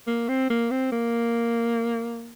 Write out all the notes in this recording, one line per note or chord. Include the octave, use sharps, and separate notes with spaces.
A#3
C4
A#3
C4
A#3